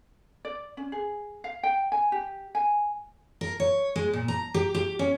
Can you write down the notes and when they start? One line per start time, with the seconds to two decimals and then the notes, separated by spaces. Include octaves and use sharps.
0.45 D5
0.77 C#4
0.92 G#4
1.44 F5
1.63 G5
1.92 G#5
2.12 G4
2.55 G#5
3.41 A#4
3.60 C#5
3.96 G#3
4.13 A#2
4.28 A#5
4.54 G4
4.75 G4
4.99 C#4